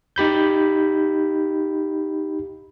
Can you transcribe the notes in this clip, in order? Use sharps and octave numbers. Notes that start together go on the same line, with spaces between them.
D#4 G4 B5 G6